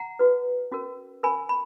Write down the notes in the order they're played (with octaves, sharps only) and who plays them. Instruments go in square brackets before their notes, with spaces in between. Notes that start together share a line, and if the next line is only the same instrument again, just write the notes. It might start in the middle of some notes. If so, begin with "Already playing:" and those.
Already playing: [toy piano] F#5 A#5
F#4 B4
C#4 F#4 A#4
C#4 F#4 A#4 G#5 B5
B5